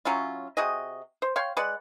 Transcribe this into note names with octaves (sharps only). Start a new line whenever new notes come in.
F#3 C#4 E4 F4
C3 F#4 G#4 D#5
C5
C#5 F5 G5 C6
G#3 B4 D5 F#5